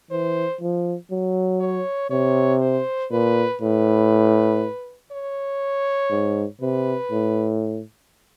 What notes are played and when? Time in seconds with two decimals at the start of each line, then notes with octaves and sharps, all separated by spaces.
0.11 E3 C5
0.61 F3
1.11 F#3
1.61 C#5
2.11 C3 C#5
2.61 C5
3.11 A#2 B4
3.61 A2 B4
5.12 C#5
6.11 G#2
6.61 C3 B4
7.12 A2